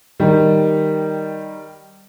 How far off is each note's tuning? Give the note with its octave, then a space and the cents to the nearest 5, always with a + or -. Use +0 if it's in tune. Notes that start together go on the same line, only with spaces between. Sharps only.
D#3 +0 G3 +0